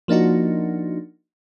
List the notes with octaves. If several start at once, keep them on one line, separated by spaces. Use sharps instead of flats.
F3 A#3 D4 D#4 F#4